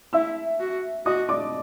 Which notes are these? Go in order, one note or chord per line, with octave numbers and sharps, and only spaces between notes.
E4 E5 E6
F#4
F#4 D#5 D#6
D5 D6